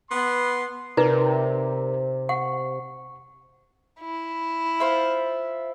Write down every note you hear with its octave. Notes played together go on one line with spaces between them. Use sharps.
B3 C6
C3 D#4 A#4 B4 D5 A#5
F#5 C#6
E4
F4 C5 E5